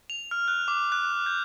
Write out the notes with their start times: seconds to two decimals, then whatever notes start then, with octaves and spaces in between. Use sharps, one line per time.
0.10 F7
0.31 F6
0.48 F#6
0.68 D6
0.92 F#6
1.26 G6